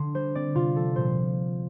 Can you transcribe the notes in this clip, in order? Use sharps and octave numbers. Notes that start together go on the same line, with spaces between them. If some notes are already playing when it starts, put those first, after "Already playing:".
Already playing: D3 C6
G3 C5
C4 D5
C3 F4
F3 A4
A#2 C5